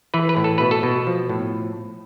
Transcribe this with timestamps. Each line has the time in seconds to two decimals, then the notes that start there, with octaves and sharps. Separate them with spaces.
0.14 E3 B4
0.29 B4
0.37 A2
0.44 A4
0.58 B2 B4
0.71 A4
0.83 B2
1.07 F3
1.29 A2